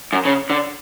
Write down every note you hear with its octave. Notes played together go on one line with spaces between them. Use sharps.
F#2
C#3
D3